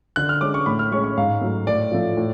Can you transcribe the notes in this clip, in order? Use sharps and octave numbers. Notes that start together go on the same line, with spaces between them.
D3 F#6
F6
G#3 C#4 D6
C#6
A2 B5
F6
G#3 C#4 C#6
C#6
G#2 F5
F#3 A3
A2 D5
F3 A3
A2